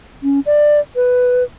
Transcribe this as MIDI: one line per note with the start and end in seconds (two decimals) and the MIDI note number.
0.23 0.40 61
0.46 0.80 74
0.96 1.44 71